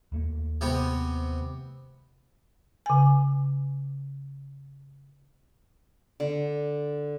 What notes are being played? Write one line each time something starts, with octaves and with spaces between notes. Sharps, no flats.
D#2 A3 A#3
C3 B3 G4
C#3 G#5
D3